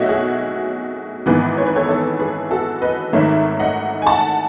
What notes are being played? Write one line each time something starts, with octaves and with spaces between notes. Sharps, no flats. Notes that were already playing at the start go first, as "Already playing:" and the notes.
Already playing: B1 B2 A3 F#4 C#5 D#5 E5
G#4
G#1 G#2 E3 B3 G#4 B4
C#5
B4
A4 C#5
A4 C#5
G#4 B4
F#4 A4
B4 D#5
G#1 G#2 D#3 A3 C#5 E5
D#5 F#5
G#5
F#5 A5